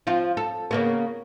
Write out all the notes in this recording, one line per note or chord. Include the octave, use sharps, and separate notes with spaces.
F3 C4 F4
A4
C#3 A#3 B3